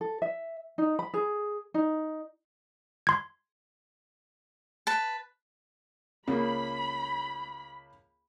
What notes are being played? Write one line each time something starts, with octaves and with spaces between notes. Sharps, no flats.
A4
E5
D#4
B5
G#4
D#4
C6 G#6
B4 A5
C#2 C#3 A#3 B5